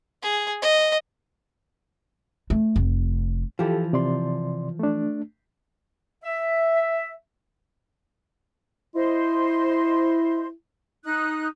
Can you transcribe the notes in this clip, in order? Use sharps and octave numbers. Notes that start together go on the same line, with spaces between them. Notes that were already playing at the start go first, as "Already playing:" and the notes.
G#4
D#5
A3
F1
E3 F3 F4 G4 A4
C3 D5 C6
A3 D4
E5
E4 C5 D#5 C6
D#4 D#6 F#6